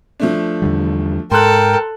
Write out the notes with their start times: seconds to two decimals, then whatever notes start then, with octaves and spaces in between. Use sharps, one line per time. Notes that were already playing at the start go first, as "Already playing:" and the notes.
0.20 F3 A3 D4
0.62 E2 D3 G3
1.31 G#2 A4 A#4 G5 C6 F#6